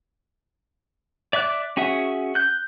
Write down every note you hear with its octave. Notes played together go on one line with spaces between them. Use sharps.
D5 E5 D6 F#6
C#4 F#4 G#4 E5 F#5
F#6 G6